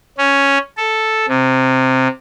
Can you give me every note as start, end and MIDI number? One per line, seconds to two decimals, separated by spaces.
0.18 0.58 61
0.77 1.26 69
1.28 2.08 48